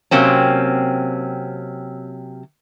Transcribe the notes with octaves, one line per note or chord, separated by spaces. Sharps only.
C3 F#3 A#3 C4 C#4